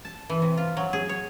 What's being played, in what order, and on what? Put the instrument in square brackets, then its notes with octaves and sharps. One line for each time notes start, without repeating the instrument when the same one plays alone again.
[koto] A5
E3
C3
F4
F#3
G#4
C#5